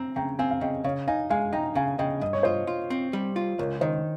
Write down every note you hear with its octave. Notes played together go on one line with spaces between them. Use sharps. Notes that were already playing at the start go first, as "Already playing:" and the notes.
Already playing: C4 A#5
C#3 G5 A#5
C4 F5 G#5
F5
C#3 D#5 G5
C#3 C#5 F5
D#4 F5 G#5
G#3 F5 G#5
D#4 G5 A#5
C#3 F5 G#5
C#3 D#5 G5
G2 D#5
C#5
F4 C5 D#5
F4
C4
G3
F4
C#2 A#4 C#5
D#3 C5 D#5